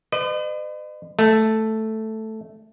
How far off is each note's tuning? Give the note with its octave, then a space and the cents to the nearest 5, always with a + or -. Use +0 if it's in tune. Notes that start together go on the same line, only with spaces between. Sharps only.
B4 +45 D#5 -40
A3 +0 A5 +0